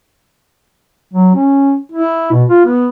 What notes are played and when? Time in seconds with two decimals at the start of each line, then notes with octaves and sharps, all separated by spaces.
1.14 F#3
1.35 C#4
1.92 E4
2.32 B2
2.50 F4
2.66 B3